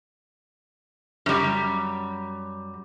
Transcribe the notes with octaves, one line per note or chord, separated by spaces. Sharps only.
F#2 G3